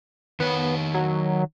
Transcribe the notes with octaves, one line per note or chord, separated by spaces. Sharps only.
D#3 B3 C#5
F#3